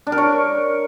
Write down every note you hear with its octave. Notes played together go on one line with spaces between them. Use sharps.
D4
A#4
C#5